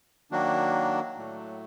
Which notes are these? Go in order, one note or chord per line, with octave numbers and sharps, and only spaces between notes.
D#3 F#3 A#3 D4 F#4
A2 F#3 A3